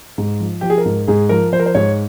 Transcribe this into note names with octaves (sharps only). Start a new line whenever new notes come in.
G#2
F3
F3 G4
G#4
A#4
G#2
G#2 G#4
F3 A#4
F3 C5
A#4
C5
G#2 C#5